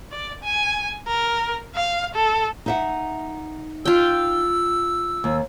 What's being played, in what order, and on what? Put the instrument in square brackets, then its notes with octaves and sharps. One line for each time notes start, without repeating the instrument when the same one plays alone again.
[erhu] D5
G#5
A#4
F5
A4
[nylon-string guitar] D#4 E5 F#5
[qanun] F4 G5 [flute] E6
[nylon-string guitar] D#2